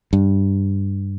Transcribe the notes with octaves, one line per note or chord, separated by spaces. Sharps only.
G2